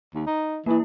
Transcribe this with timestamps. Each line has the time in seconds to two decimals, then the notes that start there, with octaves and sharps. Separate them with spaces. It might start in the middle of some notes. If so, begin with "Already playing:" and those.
0.14 D#2
0.26 D#4
0.66 E3 A#3 E4